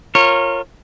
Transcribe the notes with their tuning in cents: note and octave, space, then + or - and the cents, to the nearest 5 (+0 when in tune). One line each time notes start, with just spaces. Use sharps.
F4 +0 A#4 -20 C#5 -20